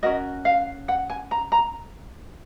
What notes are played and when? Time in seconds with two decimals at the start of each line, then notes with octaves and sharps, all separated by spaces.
0.03 C#4 F#4 A#4 D#5
0.45 F5
0.88 F#5
1.10 G#5
1.31 A#5
1.52 A#5